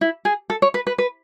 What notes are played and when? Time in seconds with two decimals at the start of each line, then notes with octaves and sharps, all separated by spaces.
0.01 E4
0.25 G#4
0.50 A4
0.62 C#5
0.74 B4
0.87 B4
0.98 B4